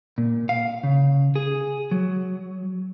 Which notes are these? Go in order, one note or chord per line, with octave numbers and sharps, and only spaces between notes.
A#2
F5
C#3
G#4
F#3